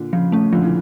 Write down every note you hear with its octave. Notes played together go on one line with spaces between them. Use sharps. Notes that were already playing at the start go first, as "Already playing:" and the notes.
Already playing: A#2 D3
C#3 F3
A3 C#4
A#2 D3 F3
C#3 E3